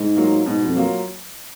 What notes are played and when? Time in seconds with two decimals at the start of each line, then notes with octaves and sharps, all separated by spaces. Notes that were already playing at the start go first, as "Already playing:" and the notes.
Already playing: G#2
0.16 F#3 A#3 F4
0.46 G#2 B2
0.66 F2
0.75 F#3 A#3 F4